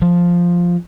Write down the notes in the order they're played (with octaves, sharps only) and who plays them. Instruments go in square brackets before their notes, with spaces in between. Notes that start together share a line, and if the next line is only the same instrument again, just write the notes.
[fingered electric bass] F3